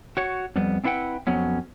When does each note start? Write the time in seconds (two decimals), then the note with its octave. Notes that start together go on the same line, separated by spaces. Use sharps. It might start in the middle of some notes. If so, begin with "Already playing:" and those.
0.17 F#4 C#5
0.56 F2 G3 B3
0.84 C4 D4 E4 B4 F#5 G5
1.27 F2 F#3 B3 C#4